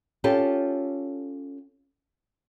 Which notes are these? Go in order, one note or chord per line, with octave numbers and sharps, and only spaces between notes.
C#4 F4 G4 A4